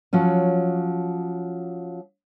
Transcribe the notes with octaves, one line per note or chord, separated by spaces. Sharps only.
F3 F#3 C#4